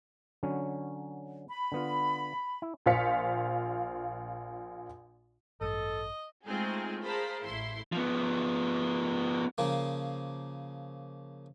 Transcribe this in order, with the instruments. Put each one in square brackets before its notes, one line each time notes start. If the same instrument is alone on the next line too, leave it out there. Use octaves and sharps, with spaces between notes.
[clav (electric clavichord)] D3 F#3 C#4
[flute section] B5
[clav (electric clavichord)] D3 B3 F4
E4
[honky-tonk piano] A#1 F4 C5 F5 B6 C#7
[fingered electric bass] A1 G2 [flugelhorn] A4 [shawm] D#5
[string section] G#3 A3 C4 D#4 F4 G#4
G#4 A#4 C5 F5 A5 B5
A1 A3 E4 C6
[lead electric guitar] F3 B3
[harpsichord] C#3 F3 A#3